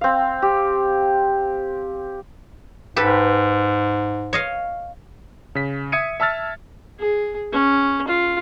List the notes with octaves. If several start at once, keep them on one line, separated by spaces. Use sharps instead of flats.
C4 F5
G4
G#2 G4 A4 B4
C#5 D#5 F5
C#3 B6
E5 D#6 G#6 C#7 D#7
E5 A5 E6 F6 A6
G#4
C#4
F4